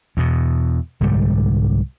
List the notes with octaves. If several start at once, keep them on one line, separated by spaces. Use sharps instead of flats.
E2 B2
C2 G#2 D3 G3